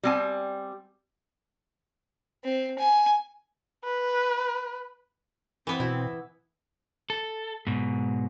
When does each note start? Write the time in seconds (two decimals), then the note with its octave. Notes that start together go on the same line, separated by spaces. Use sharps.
0.03 G3 C4 G#5
2.44 C4
2.78 G#5
3.84 B4
5.67 E3 B3 C4
5.80 B2 E4
7.10 A4
7.67 G#2 B2